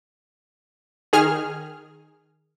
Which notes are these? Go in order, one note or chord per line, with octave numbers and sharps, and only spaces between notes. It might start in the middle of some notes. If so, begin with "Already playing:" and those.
D#3 G#4 F6